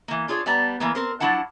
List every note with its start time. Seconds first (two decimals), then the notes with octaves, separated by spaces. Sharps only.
0.08 E3 A#3
0.28 D4 F4 G#4 C#5
0.46 G3 B3 D5 A5 A#5
0.80 E3 A#3 B3
0.95 C4 A#4 C5
1.20 F3 F#3 D4 E4 F#5 A5